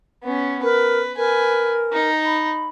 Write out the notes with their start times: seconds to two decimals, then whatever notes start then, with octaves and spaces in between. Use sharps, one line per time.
0.23 B3 C#4
0.63 A#4 B4
1.17 A#4 B4 G#5
1.92 D#4
2.25 B5